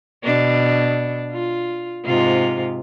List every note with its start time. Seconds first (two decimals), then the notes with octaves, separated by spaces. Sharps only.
0.24 B2 D4
1.31 F4
2.05 G#2 C3 F4